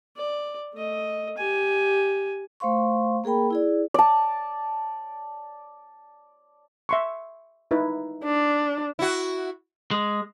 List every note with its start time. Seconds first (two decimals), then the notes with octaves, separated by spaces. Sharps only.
0.17 D5
0.74 A3 D#5
1.37 G4 G#5
2.60 A3 C5 F5 C6 C#6
3.24 A#3 G#4 A#4 G5 B5
3.51 E4 G#4 D5
3.94 D5 A5
6.89 E5 C6 C#6
7.71 D#4 E4 B4
8.24 D4
8.99 E4 F#4
9.91 G#3